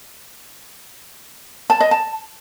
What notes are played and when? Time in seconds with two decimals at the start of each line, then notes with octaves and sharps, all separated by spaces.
1.70 A5
1.80 D#5
1.91 A5